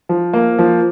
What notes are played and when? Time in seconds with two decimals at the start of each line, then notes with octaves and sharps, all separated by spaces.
0.09 F3
0.33 A#3
0.59 F3